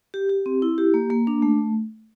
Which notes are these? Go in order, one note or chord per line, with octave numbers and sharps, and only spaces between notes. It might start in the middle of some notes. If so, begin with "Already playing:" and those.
G4
G4
C4
E4
G4
A#3
A#3
D4
A3